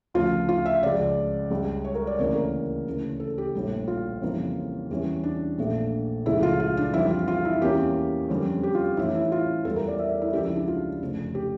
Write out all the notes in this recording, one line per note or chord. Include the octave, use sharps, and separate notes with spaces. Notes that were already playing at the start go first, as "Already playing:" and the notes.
D2 C#3 F3 F4
F4
E5
C#2 C#3 F3 D5
C#2 C#3 G3
C#5
A#4
D5
D2 C#3 E3 A#3 C#5
A#4
D2 C#3 E3
A4
G4
A#1 A2 G3
F4
F2 C#3 E3 G3 A#3
E2 E3 G3 C#4
D4
A#1 A#2 A3 D4
C#2 C#3 F3 A3 E4
F4
F4
D4
F2 E3 G3 D4 E4
F4
F4
E4
E2 E3 A#3 C#4 G4
F2 D3 G3 C#4
G4
F4
A1 A2 E3 E4
E4
F4
E2 E3 G3 A4
A#4
D5
E5
E4
C#2 C#3 F3 G4
E4
D4
F4
F1 F2 C#3
G4